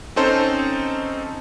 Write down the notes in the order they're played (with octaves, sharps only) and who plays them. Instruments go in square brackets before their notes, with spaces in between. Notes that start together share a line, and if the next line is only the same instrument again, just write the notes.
[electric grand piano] C4 C#4 D#4 A4 C5